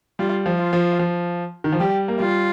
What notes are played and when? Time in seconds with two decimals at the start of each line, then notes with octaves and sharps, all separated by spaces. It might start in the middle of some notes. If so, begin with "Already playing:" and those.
0.19 G3 F4
0.46 F3
0.59 F4
0.73 F3
0.99 F3
1.64 D#3
1.72 F3
1.80 G3 G4
2.08 A#3
2.20 G3 F4